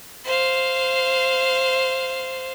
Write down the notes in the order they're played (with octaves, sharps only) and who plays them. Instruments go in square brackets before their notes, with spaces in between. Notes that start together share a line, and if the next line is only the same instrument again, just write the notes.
[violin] C5 F5